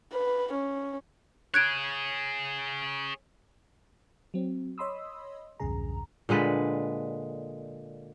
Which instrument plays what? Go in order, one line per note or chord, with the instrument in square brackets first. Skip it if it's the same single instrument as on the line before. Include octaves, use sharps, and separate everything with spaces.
[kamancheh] B4
C#4
[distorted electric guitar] G#4 C#5 [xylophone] F#6 G#6 D7
[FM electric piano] F#3 C4
C#5 D#5 B5 C6 D#6 E6
B1 E2 G2 C#3 G#4 A#5
[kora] A#2 D3 G#3 B4